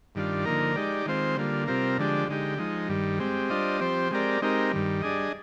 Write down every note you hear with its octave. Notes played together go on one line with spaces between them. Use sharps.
G2 D#3 G3 D4 F4
D3 F3 A#3 D#4 A#4
G#3 D#4 G4 D5
D#3 G#3 C4 F4 C5
D3 G3 A#3 F4
C3 G3 C4 F4 A#4
D3 F3 G#3 D4 G4
D3 G#3 D#4 G4
F3 G#3 D#4
G2 D#3 G3
G#3 C4 G4
G3 D4 F4 C5 D#5
F3 C4 G4 C5
G#3 C4 G4 A#4 D5
G#3 C4 D#4 G4 A#4
G2 D#3 G3
G3 D4 G#4 D#5